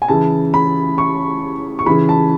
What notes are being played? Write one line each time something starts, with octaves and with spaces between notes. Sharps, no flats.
G#5
C#3 E3 A5
B5
C#6
C#6
C#3 E3 B5
A5